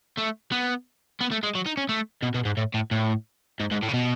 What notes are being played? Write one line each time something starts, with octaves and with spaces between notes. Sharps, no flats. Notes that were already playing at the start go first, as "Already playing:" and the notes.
A3
B3
B3
A3
G#3
F#3
D#4
C#4
A3
B2
B2
G#2
A2
A2
A2
G#2
G#2
A2
C#3
B2